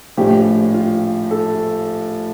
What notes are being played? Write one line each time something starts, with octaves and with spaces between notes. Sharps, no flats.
A#1 A2 F3 G4
F4
A4